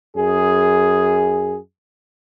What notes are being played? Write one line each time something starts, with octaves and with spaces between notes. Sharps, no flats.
F#2 G#4